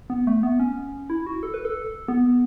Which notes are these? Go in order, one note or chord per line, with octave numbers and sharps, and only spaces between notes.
B3
A3
B3
C#4
E4
F#4
A4
B4
A4
B3